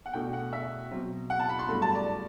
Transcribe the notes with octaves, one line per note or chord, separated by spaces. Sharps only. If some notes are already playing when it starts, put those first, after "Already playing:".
F#5
B2 A3 D4 G5
F#5
E5
B2 F#3 C4
F#5
A5
B5
C6
G2 F#3 A3 B5
A5
D5